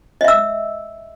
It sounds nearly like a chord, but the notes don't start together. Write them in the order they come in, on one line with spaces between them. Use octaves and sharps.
D#5 E5 E6